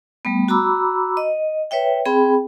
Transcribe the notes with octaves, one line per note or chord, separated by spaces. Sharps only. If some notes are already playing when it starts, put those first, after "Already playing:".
G3 A3 B3
F#4 A#5 B5 D6 E6
D#5
B4 C#5 E5 G5
C4 G#4 G5 B5